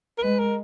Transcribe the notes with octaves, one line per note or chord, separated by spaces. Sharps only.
A#4
G#3 B4
A#4